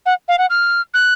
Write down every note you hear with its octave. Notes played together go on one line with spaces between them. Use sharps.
F#5
F5
F#5
F6
F#6